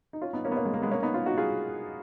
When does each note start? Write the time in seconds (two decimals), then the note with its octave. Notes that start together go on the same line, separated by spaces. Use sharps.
0.13 D#4
0.21 C#4 F4
0.33 B3 D#4
0.45 A#3 C#4
0.52 B3
0.57 A#3 C#4
0.65 G#3 B3
0.74 A#3
0.82 G#3 B3
0.91 A#3 C#4
1.02 B3 D#4
1.14 C#4 F4
1.26 D#4 F#4
1.37 F4 G#4